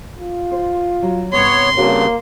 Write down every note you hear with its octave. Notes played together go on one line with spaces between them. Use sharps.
F4
C5
F#3
G2 C3 B3 C#5 C6
G2 C#3 A#3 C4 F#4 C#5